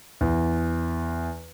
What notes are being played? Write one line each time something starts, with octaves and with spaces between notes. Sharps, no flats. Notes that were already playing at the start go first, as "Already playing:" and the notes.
E2